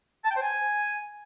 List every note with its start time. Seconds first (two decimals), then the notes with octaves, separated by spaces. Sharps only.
0.25 A5
0.31 G5
0.36 C5
0.42 G#5